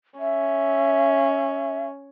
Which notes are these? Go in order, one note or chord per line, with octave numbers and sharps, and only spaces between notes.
C#4 E5